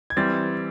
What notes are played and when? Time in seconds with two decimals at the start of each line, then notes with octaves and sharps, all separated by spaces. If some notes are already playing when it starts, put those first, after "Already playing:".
0.10 G#6
0.17 E3 G3 C4 A6